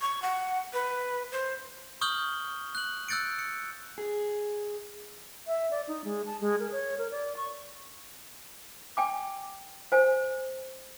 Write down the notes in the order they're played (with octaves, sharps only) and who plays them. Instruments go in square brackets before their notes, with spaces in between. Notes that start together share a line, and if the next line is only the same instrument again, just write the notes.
[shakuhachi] C#6
F#5
B4
C5
[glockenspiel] C#6 D#6 F6 G6 F#7 G7
F#6 F#7
E6 F#6 G6 A6 C#7 D7
C#7
[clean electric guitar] G#4
[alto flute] E5
D5
D#4
G#3
A5
G#3
A#4
C#5
A#4
D5
C#6
[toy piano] G5 G#5 D6
C5 G#5